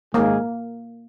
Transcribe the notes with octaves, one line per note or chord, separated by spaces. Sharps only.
G#2 D#3 G#3 A#3 D#4 G#4